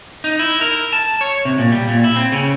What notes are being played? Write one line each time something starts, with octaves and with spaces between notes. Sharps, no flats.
D#4
E4
A#4
A5
C#5
C3
A#2
G3
A#2
E4
C4
C#3